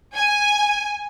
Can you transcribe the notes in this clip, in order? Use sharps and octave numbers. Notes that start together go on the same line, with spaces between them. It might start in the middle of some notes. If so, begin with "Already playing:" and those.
G#5